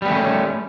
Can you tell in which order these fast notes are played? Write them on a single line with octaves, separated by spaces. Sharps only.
G3 B3 A3 C#4